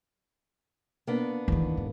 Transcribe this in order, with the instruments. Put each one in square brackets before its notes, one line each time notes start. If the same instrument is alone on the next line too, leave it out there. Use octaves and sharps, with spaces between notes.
[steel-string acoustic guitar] A#3 B3 D4
[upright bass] E2 D#3
G#2